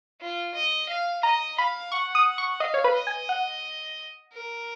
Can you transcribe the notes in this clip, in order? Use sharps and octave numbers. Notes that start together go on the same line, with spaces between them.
F4
D#5
F5
D#5 A#5
F5 B5
F#5 C#6
D#6
C#6
D#5 F5
C#5
B4
D#5
G#5
F#5
A#4